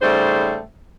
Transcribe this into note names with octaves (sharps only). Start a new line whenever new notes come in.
G#2 C#3 G3 A3 C5